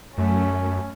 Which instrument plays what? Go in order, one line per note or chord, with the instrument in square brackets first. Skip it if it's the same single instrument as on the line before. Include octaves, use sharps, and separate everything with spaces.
[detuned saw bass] F#2 [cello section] A3 [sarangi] C#4